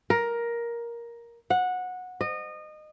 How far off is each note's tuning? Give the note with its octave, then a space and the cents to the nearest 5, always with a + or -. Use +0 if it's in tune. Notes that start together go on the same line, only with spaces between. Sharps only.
A#4 +10
F#5 -15
D#5 -25